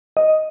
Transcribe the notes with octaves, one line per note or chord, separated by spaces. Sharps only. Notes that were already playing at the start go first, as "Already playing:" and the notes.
D#5